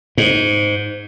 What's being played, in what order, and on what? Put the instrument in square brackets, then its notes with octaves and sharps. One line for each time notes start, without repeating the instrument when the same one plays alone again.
[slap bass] G#2